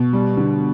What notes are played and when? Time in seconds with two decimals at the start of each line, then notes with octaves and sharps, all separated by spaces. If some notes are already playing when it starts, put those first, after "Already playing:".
Already playing: B2
0.13 G3
0.37 D3